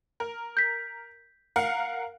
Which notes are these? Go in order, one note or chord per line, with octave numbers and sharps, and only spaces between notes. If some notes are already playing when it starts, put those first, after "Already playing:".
A#4
G6 B6
A#4 F5 F#5